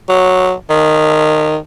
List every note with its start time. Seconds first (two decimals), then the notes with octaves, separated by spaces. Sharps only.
0.09 F#3
0.70 D#3